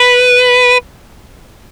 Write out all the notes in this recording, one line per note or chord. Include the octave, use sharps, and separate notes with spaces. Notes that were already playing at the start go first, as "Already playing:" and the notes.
Already playing: B4